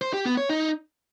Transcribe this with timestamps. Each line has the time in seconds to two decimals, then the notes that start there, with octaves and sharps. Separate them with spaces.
0.01 C5
0.13 G4
0.25 B3
0.37 C#5
0.49 D#4